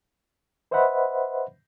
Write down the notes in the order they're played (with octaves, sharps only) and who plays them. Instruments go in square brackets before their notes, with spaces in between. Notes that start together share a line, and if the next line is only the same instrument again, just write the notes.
[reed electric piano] B4 C5 D#5 E5 F#5 B5